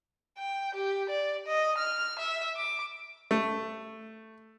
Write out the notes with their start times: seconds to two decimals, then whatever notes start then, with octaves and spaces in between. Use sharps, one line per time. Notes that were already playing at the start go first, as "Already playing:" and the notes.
0.38 G5
0.74 G4
1.09 D5
1.47 D#5
1.77 F6
2.19 E5
2.56 D6
3.31 A3